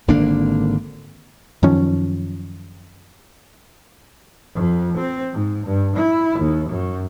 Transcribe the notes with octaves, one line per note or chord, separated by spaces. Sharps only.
G#1 D3 A#3 D4
F#2 D#3 F3 C#4
F2
C4
G#2
G2
E4
D#2
F#2